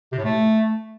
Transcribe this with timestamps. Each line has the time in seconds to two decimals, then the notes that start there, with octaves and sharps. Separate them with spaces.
0.12 C3
0.18 A2
0.24 A3